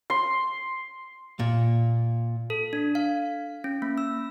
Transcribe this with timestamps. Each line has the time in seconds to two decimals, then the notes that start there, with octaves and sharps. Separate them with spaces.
0.10 C6
1.39 A#2
2.50 A4
2.73 D4
2.95 F5
3.64 C#4
3.82 A#3
3.98 E6